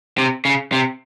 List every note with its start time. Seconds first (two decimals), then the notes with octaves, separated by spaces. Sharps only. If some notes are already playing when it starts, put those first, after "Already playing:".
0.18 C3
0.45 C#3
0.72 C3